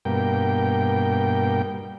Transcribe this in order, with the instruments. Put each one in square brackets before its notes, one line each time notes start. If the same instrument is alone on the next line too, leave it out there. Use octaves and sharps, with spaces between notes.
[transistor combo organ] G2 B2 A#3 G5